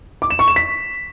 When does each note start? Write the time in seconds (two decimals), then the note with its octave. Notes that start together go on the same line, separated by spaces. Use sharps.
0.22 D6
0.30 E7
0.39 C#6
0.48 E7
0.56 B6